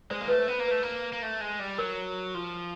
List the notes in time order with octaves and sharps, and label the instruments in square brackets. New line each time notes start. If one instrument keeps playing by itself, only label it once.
[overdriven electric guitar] G#3 [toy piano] C5 D5
[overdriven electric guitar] A#3
[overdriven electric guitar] A3 [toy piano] B4
[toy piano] C5
[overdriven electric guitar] B3
[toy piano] C5
[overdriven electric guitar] A#3
[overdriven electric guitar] A3 [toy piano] B4
[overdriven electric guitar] A#3
A#3
A3
G#3
G3
[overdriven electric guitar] F#3 [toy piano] A#4
[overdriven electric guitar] F3